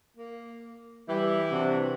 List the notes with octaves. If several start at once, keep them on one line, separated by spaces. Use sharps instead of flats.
A#3
E3 G3 E4 G4
C3 D4 F#4